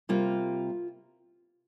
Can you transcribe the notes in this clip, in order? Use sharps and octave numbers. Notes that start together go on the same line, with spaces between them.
C3 G3 A#3 F4